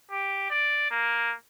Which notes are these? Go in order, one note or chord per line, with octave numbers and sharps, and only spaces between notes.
G4
D5
A#3